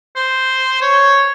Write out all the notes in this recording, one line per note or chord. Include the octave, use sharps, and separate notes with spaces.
C5
C#5